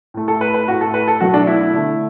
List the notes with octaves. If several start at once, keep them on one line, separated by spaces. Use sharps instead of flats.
A2 A3
A4
B4
B4
A2 A3 F#4
A4
B4
A4
B2 F#3 A3 F#4
D4
E4
E4
D3 A3